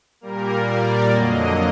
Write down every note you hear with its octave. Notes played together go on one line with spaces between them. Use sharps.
A#2 G3 A#3 A#4
D5
F2 D3 F#3 A#3 D#5